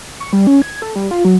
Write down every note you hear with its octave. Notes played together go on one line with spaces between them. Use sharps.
C#6
G3
C#4
G#6
A4
G3
F4
F#3